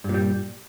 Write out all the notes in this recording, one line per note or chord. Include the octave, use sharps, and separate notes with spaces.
G2 A#2 G3